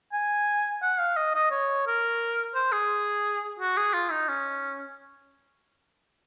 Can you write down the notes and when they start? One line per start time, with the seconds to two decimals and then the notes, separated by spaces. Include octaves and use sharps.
0.13 G#5
0.82 F#5
1.00 F5
1.16 D#5
1.34 D#5
1.51 C#5
1.87 A#4
2.55 C5
2.72 G#4
3.59 F#4
3.77 G#4
3.93 F4
4.11 D#4
4.28 C#4